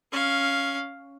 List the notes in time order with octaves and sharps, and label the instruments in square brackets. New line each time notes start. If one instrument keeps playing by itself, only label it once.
[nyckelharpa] C#4 F5